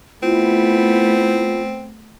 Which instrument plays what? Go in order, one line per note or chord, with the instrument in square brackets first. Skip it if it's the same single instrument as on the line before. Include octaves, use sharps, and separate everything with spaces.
[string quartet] A3 B3 [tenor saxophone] C4 [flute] E4 [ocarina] F4